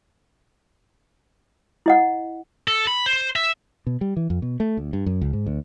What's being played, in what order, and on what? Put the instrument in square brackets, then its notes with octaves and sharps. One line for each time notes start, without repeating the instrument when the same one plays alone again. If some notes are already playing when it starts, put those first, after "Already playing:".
[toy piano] E4 D#5 F#5
[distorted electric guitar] A4
B5
C5
E5
[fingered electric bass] B2
G3
E3
F2
B2
A3
D2
G2
F#2
C#2
G#2
D2